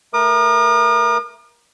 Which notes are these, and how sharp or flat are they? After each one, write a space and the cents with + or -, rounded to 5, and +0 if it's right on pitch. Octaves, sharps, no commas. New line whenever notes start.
A3 +10 A#4 +20 D#6 -45